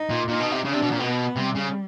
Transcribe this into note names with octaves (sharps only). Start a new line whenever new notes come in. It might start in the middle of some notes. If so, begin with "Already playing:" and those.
Already playing: D#4
A#2
A#2 D#4
B2
C3
C#3 D4
C3
B2
A#2
B2 B3
C3 G3
C#3